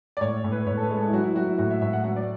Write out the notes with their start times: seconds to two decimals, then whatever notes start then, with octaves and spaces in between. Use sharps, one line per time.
0.17 D5
0.21 A2 C#5
0.44 A2
0.52 B4
0.67 A2 C#5
0.77 A4
0.83 B4
0.90 G#3
0.97 A4
1.08 E4
1.13 F#3 F#4
1.24 E4
1.35 F#3 F#4
1.47 E4
1.58 A2 F#4
1.70 E5
1.81 A2 E5
1.93 F#5
2.04 F#3 F#5
2.16 D5